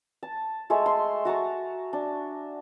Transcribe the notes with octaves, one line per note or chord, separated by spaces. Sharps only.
A5
G#3 A3 A4 E5
C6
F#4 A5 A#5 C#6
D4